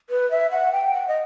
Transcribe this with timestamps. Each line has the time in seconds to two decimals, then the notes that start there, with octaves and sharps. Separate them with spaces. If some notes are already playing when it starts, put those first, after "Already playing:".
0.10 B4
0.31 E5
0.51 F#5
0.73 G5
0.94 F#5
1.08 D#5